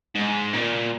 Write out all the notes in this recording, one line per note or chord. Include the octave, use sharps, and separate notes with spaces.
G#2
A#2